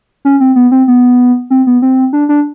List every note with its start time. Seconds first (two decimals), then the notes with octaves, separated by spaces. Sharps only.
0.25 C#4
0.40 C4
0.56 B3
0.72 C4
0.88 B3
1.50 C4
1.67 B3
1.82 C4
2.13 D4
2.29 D4